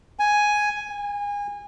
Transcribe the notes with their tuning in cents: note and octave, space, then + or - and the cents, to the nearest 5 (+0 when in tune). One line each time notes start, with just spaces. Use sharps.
G#5 +5
G#5 -30